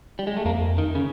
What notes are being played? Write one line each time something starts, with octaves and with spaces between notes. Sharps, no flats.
G3
G#3
A3
F2 A#3
D#3
C#3